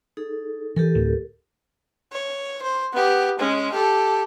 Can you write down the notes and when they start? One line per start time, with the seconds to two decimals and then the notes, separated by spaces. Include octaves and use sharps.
0.17 D#4 G#4 A4
0.76 E3 G4 A4 A#4
0.95 D2 A2
2.12 C#5
2.62 C5
2.94 B3 G4
3.39 G#3 C#4
3.73 G4 A4